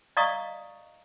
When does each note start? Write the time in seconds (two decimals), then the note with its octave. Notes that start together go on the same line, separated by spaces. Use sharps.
0.17 D5 D#5 F5 A#5 C#6 D#6